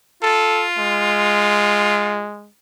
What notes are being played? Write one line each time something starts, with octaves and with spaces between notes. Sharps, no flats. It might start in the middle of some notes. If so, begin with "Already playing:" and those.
F4 A4
G#3